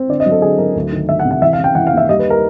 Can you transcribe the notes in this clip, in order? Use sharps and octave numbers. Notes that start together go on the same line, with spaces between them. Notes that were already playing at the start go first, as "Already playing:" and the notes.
Already playing: C4
D3 D5
D#5
F#3
A4
D3 G#4
F#3 A#4
D2
D#3
D2 E5
F#5
C3
F#5
E3 E5
F5
C#3
G5
E3 F#5
F5
D#2
E5
G3 D#5
B4
A#4